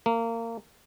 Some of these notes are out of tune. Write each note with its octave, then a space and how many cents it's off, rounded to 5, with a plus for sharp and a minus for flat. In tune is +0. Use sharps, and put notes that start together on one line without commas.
A#3 -25